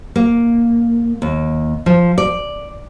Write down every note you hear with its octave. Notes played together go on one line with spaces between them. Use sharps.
A#3
D#2
F3
D5